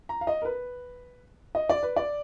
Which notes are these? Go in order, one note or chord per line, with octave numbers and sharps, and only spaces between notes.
A#5
F5
D#5
A#4
B4
D#5
D5
B4
D5